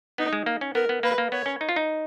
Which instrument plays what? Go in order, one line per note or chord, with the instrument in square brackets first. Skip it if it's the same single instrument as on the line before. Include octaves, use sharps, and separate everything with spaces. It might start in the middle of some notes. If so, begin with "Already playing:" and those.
[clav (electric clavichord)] B3 [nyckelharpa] D#4
[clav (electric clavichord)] G#3
A#3
C#4
[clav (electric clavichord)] B3 [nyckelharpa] A#4
[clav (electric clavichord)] B3
[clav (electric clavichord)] A#3 [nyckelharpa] B4
[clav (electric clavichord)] A#3
[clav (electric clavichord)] B3 [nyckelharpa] C#5
[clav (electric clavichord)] C#4
D#4
F4
D#4